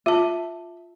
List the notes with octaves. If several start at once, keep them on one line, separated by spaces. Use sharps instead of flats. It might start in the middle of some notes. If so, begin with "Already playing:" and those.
F4 E5 A5